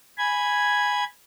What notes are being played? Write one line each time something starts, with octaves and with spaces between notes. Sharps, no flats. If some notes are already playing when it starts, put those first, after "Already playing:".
G#5 B5 G#6